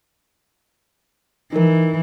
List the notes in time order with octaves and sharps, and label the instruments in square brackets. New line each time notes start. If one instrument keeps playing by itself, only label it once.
[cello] E3 [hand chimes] D#4 A#4